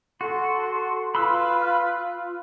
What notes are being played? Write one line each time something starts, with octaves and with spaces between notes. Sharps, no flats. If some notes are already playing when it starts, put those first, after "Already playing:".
F#4 A4 C6
F4 B4 B5 C6 E6